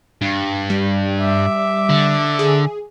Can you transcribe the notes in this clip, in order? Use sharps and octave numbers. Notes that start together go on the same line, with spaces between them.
G2
G3
E5 D6
D3
G#4